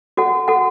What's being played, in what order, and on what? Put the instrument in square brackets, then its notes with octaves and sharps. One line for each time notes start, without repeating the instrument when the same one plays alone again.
[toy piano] F#4 A4 F#5
F#4 A4 F#5